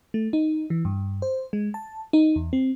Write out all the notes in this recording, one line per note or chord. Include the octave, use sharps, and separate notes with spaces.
A3
D#4
E3
G2
C5
G#3
A5
D#4
E2
C4